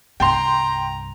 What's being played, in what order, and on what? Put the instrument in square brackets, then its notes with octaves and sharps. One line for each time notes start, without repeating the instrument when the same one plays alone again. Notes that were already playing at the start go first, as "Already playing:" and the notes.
[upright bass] C2 G2 [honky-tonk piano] G5 C6 [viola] A#5